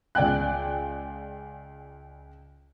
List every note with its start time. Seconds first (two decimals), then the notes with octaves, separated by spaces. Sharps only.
0.15 C#2 D5 G5 G#5 F#6